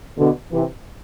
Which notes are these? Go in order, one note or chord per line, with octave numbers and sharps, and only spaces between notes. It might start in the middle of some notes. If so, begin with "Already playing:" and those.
B2 D3
C3 E3